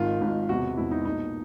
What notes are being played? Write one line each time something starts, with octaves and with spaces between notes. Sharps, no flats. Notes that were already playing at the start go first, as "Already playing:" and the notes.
Already playing: G#1 G#2 D#3 F4
G#1 G#2 D#3
E1 E2 C3 F#4
E1 E2 C3 E4
D#4
B1 A#2 D#4